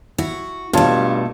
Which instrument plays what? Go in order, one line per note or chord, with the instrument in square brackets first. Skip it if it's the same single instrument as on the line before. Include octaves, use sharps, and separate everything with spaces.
[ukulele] E4 [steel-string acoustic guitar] F#4
[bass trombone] G2 [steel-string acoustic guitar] B2 A3 [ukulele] F4 C#5 [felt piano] F5 A5